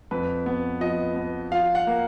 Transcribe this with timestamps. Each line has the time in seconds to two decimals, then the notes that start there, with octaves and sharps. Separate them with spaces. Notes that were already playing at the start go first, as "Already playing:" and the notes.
0.11 F2 B4
0.46 B3
0.81 F3 D#5
1.16 B3
1.52 F3 F5
1.75 F#5
1.87 A#3